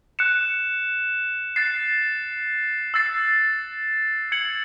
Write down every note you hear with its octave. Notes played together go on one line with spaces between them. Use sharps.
F#6 C#7 E7
F#6 A6 C7
E6 A6 C7
G#6 C#7 F#7